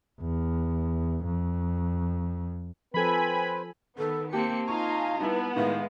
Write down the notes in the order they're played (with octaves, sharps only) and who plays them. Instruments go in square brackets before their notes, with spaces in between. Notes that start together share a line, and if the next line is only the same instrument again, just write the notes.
[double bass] E2
F2
[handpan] F3 A4 [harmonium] C4 B4 [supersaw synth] G#5 B5
[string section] D#3 B3 [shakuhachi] A4
[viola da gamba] A#3 C4 [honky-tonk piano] G4 [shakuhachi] A5 [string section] C#7
[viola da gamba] D#4 F4 [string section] F5 G#5 A#5 [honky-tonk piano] C#6
[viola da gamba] G3 [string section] B3 [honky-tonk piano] D#4 E4
[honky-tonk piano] A2 D#3 [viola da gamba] G#3 [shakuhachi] F5